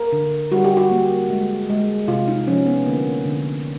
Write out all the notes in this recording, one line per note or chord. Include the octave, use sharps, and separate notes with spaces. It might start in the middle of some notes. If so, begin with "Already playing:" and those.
Already playing: A#4
D3
G3 F#4
G4
F#4
A#3
G#3
G#3
C3 F4
D#4
F3 C#4
B3
D3 A#3
D3